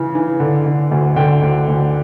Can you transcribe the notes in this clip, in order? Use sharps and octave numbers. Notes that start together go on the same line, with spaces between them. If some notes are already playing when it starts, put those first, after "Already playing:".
Already playing: C#3 E3
E3
D3
D3
D2
D3 G5
D2
D2